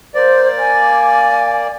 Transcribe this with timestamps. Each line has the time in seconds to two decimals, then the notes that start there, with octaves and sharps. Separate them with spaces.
0.15 A#3 C5 D5
0.59 G#5